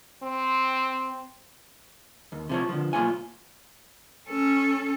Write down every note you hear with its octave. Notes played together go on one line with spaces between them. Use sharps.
C4
D#2
C3 F3 C#5
D3 F3
B1 A#3 F4 C#5 G#5
C#4 A4